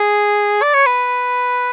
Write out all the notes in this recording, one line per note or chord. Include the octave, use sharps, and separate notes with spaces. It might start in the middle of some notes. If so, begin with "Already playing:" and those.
Already playing: G#4
D5
C#5
B4